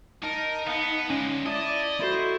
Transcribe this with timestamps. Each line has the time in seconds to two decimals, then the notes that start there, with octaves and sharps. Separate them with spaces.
0.24 D#4 A#4 A5
0.68 B3 F5 A5
1.10 D3 G#3 C#4
1.46 E4 D5 D#5 A5
2.00 E4 F#4 A4 C5 B5